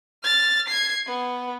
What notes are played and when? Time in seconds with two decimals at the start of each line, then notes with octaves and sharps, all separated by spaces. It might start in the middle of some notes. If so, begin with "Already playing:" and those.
0.24 F6 A6
0.68 G#6 C7
1.06 B3